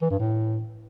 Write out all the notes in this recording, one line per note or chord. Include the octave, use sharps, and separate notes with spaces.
E3
G2
A2